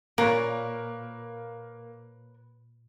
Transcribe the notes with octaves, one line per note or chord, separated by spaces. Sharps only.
A#2 A#3 A#4 B4 C#5